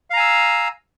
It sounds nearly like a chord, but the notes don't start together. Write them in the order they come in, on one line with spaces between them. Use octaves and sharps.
F5 A#5 G#5 E6